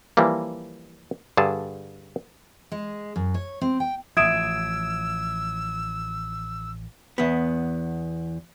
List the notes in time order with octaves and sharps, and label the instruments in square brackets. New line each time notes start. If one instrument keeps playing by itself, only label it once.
[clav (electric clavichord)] E3 F3 G3 A#3
G2 D3 G#4 A5
[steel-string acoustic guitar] G#3
F#2
C#5
C4
G5
[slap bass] A1 F3 [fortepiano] E5 D#6 [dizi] E6 [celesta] G#6 D7 E7
[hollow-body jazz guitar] E2 B3